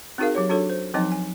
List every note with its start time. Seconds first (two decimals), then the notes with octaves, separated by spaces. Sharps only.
0.18 C4 D#4 F#4 G#4 A#4 F5
0.35 F#3 G4 C#5
0.49 D4 F#4 A4 C#5
0.70 C5
0.94 F3 F#3 C4 D#4 D#5 G#5
1.12 G#5